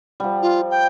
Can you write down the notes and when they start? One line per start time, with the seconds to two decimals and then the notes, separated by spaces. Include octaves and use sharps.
0.20 F3 G3
0.42 F4
0.71 G5